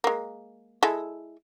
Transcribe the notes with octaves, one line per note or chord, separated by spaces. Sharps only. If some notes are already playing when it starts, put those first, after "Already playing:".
G#3 A#3
G#3 E4 A4